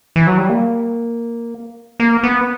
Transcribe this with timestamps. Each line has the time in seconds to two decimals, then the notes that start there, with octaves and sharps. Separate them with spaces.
0.16 E3
0.27 F#3
0.38 G3
0.49 A#3
2.00 A#3
2.24 B3